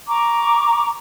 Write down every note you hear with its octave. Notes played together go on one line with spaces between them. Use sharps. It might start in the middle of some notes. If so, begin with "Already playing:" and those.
A#5 C#6 D6